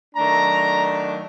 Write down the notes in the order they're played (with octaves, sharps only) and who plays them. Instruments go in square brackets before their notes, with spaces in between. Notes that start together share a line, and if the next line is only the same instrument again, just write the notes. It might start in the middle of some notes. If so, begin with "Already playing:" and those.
[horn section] D#3 F#3 A3 D4 A#5